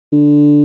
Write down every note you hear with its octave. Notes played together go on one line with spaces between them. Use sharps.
D3